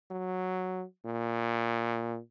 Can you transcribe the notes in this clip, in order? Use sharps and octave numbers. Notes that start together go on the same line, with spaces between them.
F#3
A#2